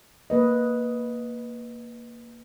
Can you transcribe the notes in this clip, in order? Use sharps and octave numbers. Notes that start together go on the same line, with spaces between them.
A#3 B4 D#5